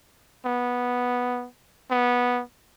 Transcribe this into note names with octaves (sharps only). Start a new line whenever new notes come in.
B3
B3